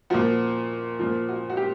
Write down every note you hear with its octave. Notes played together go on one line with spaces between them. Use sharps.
A#2 F3 F#4
A#2 F3
F#4
F#4
G4